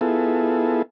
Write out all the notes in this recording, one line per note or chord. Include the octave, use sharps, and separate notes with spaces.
B3 E4 F4 G#4 A4